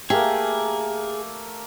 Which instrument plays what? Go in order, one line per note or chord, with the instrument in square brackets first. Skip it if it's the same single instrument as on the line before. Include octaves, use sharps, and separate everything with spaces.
[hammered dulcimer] A3 A#3 [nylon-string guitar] G4 [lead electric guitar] G#4